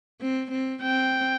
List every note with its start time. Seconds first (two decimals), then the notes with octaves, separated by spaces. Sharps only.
0.21 C4
0.51 C4
0.82 C4 G5